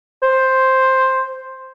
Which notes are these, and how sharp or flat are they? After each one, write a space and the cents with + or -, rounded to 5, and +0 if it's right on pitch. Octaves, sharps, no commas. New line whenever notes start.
C5 +5